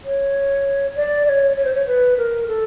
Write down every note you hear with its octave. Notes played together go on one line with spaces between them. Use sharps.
C#5
D5
D5
C#5
C#5
C5
C#5
B4
A#4
A4